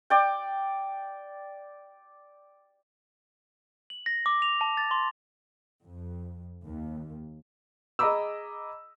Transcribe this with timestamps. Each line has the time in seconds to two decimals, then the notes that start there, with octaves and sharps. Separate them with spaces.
0.10 D5 G5
3.90 F#7
4.06 A#6
4.26 D6
4.42 F7
4.61 A5
4.77 A6
4.91 C6
5.84 F2
6.66 D#2
7.99 G#4 D#5 A#5 B5 D6 E6